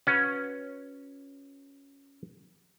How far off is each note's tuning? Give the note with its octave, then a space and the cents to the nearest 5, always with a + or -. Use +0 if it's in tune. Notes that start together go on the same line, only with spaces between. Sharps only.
C#4 +0 F#4 -25 B4 -5